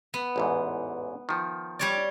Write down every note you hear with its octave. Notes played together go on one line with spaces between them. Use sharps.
B3
A1 E2 G#2
D#3 F3
G3 C#5 D5